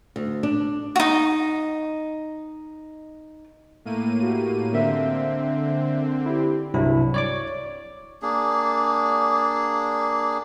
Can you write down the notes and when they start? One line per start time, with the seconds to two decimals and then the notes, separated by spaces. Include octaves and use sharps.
0.16 D2
0.43 D4
0.96 D#4 F#4
3.85 A2 A#3 D#7
4.23 F#4 G4
4.73 D3 A#3 C4 A#4 E5
6.26 E4 G4
6.74 C2 G2 F#3 E4
7.14 C#5 D5 D6
8.22 A#3 D4 G#4